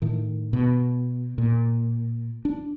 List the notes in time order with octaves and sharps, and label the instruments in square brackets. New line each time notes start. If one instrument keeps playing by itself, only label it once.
[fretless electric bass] A2 D#3
B2
A#2
D4